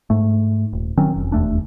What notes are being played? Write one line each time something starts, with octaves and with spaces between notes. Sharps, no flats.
G#2 A3
D#1
D#3 F#3 C4 C#4
F1
E1 D#2 A3 D4